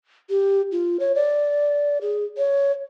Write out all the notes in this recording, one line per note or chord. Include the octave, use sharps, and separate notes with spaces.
G4
F4
C#5
D5
G#4
C#5